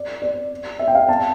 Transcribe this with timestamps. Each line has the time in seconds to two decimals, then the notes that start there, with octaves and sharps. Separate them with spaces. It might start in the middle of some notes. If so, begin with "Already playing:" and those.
Already playing: D5
0.22 D5
0.79 E5
0.88 G5
0.95 F5
1.09 A5